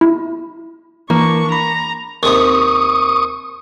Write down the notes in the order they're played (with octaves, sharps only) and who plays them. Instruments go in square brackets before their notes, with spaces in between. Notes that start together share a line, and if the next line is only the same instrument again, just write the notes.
[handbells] E4
[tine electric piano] E3 [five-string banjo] A#3 [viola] D4 C#6
[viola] A#5 [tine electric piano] B5
[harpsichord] D#2 C3 [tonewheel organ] C#6 D#6